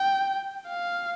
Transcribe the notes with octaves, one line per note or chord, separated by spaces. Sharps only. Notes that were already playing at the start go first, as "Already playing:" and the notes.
Already playing: G5
F5